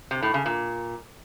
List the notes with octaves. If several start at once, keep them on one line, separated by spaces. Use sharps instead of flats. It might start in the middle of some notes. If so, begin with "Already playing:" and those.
C3
A2
C#3
A#2